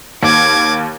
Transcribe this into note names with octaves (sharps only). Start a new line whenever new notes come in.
D#2 D6 G#6